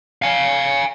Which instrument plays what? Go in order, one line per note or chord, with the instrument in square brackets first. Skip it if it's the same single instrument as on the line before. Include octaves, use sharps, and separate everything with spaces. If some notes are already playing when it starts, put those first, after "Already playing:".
[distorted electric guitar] F5 G#5